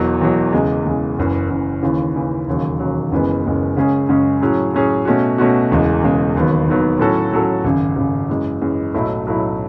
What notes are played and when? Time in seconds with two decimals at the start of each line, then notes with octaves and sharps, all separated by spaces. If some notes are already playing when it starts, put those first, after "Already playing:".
Already playing: E1 E2 B2 F#3
0.21 E1 E2 B2 F#3
0.53 E2 C#3 G#3
0.85 E2 C#3 G#3
1.18 F#1 F#2 E3
1.50 F#1 F#2 E3
1.83 D#2 C#3 E3
2.15 D#2 C#3 E3
2.47 E1 D#2 C#3 F#3
2.79 E1 D#2 C#3 F#3
3.11 F#1 F#2 E3 G#3 B3
3.44 F#1 F#2 E3 G#3 B3
3.77 F#2 C#3 G#3 C#4 G#4
4.09 F#2 C#3 G#3 C#4 G#4
4.41 A2 F#3 C#4 G#4
4.73 A2 F#3 C#4 G#4
5.05 B2 A3 C#4 F#4
5.38 B2 A3 C#4 F#4
5.71 E1 E2 C#3 G#3
6.03 E1 E2 C#3 G#3
6.35 E1 D#2 D#3 F#3 B3
6.67 E1 D#2 D#3 F#3 B3
6.99 A2 F#3 C#4 F#4 A4
7.32 A2 F#3 C#4 F#4 A4
7.64 G#1 F#2 C#3
7.96 G#1 F#2 C#3
8.29 F#2 E3 G#3
8.61 F#2 E3 G#3
8.94 B1 A2 F#3 A3 E4
9.26 B1 A2 F#3 A3 E4